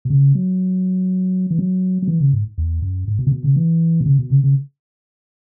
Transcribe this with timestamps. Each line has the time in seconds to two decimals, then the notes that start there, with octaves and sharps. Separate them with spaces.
0.05 B2
0.10 C#3
0.35 F#3
1.51 E3
1.59 F#3
2.02 F#3
2.08 E3
2.20 C#3
2.33 G#2
2.58 E2
2.82 F#2
3.08 G#2
3.19 B2
3.27 C#3
3.32 B2
3.44 C#3
3.56 E3
4.01 B2
4.06 C#3
4.19 B2
4.31 C#3
4.44 C#3